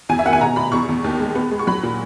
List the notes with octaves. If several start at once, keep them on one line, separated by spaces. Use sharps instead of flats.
E2 G#5
E5
D#3 F#5
G#5
B2 A#5
B2 B5
E2 C#6
E2
D#2
G#3
B3
G#3
C#6
F#3 B5
A#2